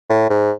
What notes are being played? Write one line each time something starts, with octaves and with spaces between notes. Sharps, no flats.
A2
G#2